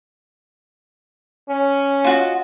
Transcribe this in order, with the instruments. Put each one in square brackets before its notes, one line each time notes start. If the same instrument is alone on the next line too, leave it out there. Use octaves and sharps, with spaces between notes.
[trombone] C#4
[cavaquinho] F4 F#4 D#5